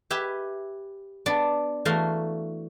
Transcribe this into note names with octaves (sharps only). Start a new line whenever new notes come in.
G4 B4 E5 G#5
B3 D4 D5
E3 A3 F#4 F5 A#5 C6